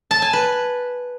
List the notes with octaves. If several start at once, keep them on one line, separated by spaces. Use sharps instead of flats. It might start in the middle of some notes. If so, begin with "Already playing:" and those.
A5
G#5
B4